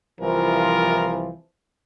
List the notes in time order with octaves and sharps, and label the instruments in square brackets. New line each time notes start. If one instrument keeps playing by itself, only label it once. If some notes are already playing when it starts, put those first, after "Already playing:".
[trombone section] C2 E3 F3 [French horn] A#4